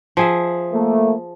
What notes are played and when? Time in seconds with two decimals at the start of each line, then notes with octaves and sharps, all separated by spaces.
0.17 F3 G#4 E5
0.72 A3 A#3